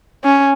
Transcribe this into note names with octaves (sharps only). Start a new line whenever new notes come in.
C#4